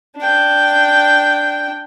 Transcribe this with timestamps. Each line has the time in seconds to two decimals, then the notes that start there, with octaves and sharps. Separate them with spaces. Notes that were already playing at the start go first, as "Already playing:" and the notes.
0.17 D4 G5